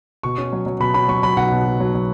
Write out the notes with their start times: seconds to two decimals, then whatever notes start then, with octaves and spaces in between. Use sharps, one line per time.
0.23 B2 C#6
0.38 C#4
0.52 F#3
0.66 F#3
0.80 B2 B5
0.94 C#4 B5
1.08 F#3 C#6
1.23 F#3 B5
1.37 B1 F#5
1.52 B2
1.65 B2
1.80 F#3
1.94 F#3